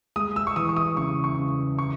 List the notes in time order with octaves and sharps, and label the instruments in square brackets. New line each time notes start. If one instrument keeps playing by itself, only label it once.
[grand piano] G#3 D#6
E6
C#6
E3 D#6
C#6
D#6
C#3 C#6
C#6
C#3
E3 C#6